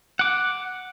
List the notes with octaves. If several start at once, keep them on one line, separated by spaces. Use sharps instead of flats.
F#5 D6